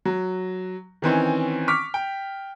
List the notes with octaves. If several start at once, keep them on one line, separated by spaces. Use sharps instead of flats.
F#3
D#3 E3 C4 C#4
C#6 D6 F6 B6
G5